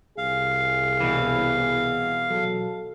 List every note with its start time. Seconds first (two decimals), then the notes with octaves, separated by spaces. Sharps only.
0.18 C2 G#4 F5
1.00 B2 E3
2.30 F#3 A4